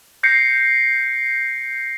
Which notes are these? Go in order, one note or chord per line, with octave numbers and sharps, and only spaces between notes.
G6 A#6 C7 C#7